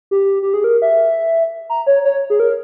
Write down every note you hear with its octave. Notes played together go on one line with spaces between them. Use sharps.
G4
G4
G#4
A#4
E5
A#5
C#5
C#5
G#4
A#4